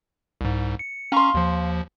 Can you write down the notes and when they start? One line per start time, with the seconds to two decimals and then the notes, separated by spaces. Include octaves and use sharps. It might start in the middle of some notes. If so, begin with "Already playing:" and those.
0.41 C2 G#2
0.79 C#7
1.12 C#4 F5 A#5 C6 C#6
1.34 D#2 F3